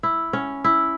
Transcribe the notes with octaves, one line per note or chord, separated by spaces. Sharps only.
E4
C#4
E4